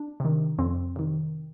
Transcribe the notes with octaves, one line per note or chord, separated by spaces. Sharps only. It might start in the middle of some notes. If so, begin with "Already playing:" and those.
Already playing: D4
C3 D#3
F2 C4
C3 D#3